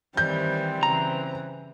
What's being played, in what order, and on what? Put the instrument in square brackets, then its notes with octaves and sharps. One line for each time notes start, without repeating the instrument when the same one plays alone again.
[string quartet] D#3 E3 G3 [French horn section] C4 [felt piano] G6
[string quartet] C#3 E3 [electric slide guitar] A#5